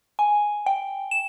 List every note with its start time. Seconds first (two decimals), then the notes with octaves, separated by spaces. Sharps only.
0.19 G#5
0.66 G5
1.11 E7